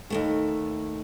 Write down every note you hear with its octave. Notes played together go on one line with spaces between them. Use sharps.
D#2 G#2 A3